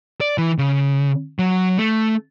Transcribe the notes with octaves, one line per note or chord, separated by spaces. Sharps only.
D5
E3
C#3
F#3
A3